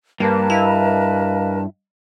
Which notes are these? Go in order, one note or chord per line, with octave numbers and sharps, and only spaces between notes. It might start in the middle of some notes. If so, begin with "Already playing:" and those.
G2 A#3 A#4 B4 A5
E4 D#5 F5